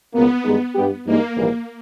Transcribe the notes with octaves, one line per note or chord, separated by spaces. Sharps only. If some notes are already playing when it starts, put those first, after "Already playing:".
C#2 B2 A#3 B3
G2 D#3 G#3 D#4 G#4
G2 G3 B3 G4
G2 E3 G#3 A#3 D#4
A#1 G#2 E3 G3 A#3